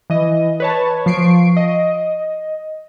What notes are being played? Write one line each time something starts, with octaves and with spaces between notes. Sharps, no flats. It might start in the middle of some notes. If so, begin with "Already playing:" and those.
E3 D#5
B4 C#5 A5
F3 C#6 C7 D7
D#5